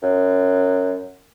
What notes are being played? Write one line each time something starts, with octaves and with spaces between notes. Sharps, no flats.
F#2